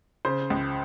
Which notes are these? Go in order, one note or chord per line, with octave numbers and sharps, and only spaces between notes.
C#3 C5
C#2